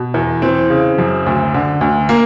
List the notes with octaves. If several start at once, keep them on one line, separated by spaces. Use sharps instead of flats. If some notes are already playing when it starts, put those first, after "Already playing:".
Already playing: B2
E2
E3 C4
C#3
F#2
D2
D3
D2
A#3